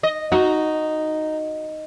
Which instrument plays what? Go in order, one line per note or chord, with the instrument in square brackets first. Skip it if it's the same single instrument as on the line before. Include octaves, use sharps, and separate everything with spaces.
[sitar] D#5
[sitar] D#4 [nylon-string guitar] F#4